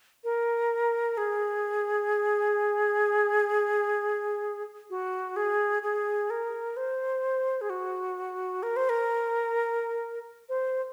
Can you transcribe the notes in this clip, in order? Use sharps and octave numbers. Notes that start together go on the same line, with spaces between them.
A#4
G#4
F#4
G#4
G#4
A#4
C5
G#4
F#4
A#4
C5
A#4
C5